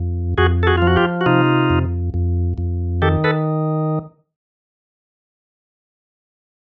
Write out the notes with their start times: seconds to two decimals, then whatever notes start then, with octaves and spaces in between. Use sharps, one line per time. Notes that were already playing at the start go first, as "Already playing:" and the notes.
Already playing: F2
0.38 F2 F#4 G#4
0.63 A4
0.67 F#4 G#4
0.77 F3 F4
0.87 F#4
0.96 F4 G4
1.21 F#4
1.26 C3 D#4 F4
1.70 F2
2.14 F2
2.58 F2
3.02 D#3 G4 A4
3.24 A4 B4